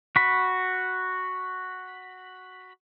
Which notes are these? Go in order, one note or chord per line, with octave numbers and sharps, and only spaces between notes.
F#4 B5